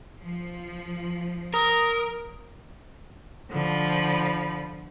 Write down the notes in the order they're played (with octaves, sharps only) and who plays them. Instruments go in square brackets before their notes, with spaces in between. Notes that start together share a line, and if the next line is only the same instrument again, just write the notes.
[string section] F3
[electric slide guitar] A#4 [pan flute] D#6
[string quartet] D3 F3 B5